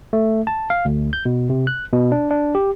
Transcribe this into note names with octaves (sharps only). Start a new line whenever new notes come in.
A3
A5
F5
D2
G6
B2
C3
F#6
B2
D4
D4
G4